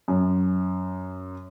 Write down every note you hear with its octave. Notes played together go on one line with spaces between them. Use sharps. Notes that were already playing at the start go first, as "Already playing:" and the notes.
F#2